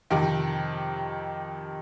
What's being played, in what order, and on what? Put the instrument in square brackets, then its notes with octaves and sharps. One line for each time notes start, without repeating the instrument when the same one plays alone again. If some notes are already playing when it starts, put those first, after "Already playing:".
[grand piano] F2 C3 D#3